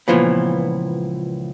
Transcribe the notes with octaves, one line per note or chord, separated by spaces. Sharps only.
C#2 A#2 E3 F3 B3